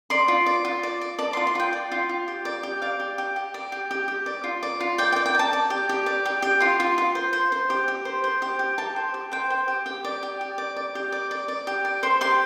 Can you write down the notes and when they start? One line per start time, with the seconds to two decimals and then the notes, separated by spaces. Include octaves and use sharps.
0.10 D5 C6
0.28 F4
0.46 D5
0.65 F4
0.83 D5
1.01 D5
1.18 D5 A5
1.33 C6
1.37 F4
1.47 C6
1.55 F4 G5
1.73 D5
1.92 F4
2.09 F4
2.28 G4
2.45 D5
2.63 G4
2.82 D5 F5
3.00 G4
3.18 G4
3.36 G4
3.54 D5
3.72 G4
3.91 G4
4.08 G4
4.26 D5
4.44 F4
4.63 D5
4.80 F4
4.98 D5 G5
5.12 G5
5.16 D5
5.26 G5
5.35 D5 A5
5.53 D5
5.70 G4
5.89 G4
6.06 D5
6.25 G4
6.42 G4
6.60 F4 C6
6.80 F4
6.98 F4
7.15 C5
7.33 C5
7.52 C5
7.70 G4
7.88 G4
8.05 C5
8.24 C5
8.42 G4
8.59 G4
8.78 G4 A5
8.96 C5
9.14 G4
9.32 C5 G5
9.50 C5
9.68 G4
9.86 G4 G5
10.04 D5
10.23 G4
10.41 G4
10.58 D5
10.76 D5
10.95 G4
11.12 D5
11.31 D5
11.48 D5
11.67 G4
11.85 D5
12.03 C5 C6
12.21 G4 C6